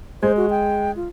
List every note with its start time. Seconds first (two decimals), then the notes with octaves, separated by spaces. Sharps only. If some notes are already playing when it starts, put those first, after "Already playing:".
0.23 G#3 C5
0.37 F#4
0.50 G5
0.96 F4